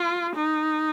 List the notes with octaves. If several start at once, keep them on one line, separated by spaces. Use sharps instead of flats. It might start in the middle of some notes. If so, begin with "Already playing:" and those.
Already playing: F4
D#4